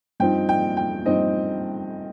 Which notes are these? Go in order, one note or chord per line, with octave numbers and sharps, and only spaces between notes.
G2 F3 C4 D#4 G5
G5
G5
G2 F3 C4 D#4 D#5